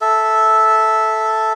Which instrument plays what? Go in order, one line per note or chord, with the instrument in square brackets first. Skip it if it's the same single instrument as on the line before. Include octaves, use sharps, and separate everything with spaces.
[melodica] A4 E5